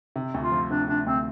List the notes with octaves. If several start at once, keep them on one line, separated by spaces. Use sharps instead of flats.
C3
D2
F4
F3
C3 D4
C3 D4
D2 C4